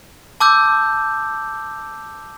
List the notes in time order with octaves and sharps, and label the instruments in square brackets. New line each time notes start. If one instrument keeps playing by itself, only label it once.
[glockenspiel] A5 D6 E6 G6